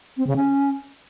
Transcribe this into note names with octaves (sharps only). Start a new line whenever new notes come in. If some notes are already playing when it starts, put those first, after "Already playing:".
C4
C#3
C#4